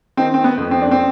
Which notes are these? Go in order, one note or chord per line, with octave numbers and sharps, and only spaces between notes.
D#3 C4 D#4
C4
B3
F2
C4
D4
C4